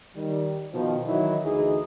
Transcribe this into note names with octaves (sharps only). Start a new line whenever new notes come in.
D#3 G3
B2 D#3 F3
D#3 E3 F#3 D#4 E4
D2 E3 D#4 G#4